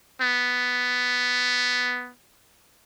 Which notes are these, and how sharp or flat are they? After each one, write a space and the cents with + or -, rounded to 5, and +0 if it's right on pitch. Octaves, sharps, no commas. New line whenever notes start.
B3 +5